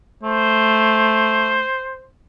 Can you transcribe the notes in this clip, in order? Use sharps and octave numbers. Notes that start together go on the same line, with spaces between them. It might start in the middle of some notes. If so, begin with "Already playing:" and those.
A3 C5